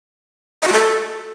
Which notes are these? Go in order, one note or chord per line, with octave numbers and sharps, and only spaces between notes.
D#5
F#4
A4